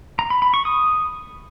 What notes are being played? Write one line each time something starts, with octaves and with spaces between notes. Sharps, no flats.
A#5
B5
B5
C#6
D#6